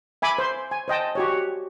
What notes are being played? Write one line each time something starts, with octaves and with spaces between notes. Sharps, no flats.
E5 G#5 B5 D6
C5 C6
G#5
C5 D#5 G5 A5
F#4 G4 C#5